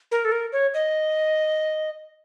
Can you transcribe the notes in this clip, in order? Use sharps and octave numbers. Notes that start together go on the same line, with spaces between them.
A#4
A4
A#4
C#5
D#5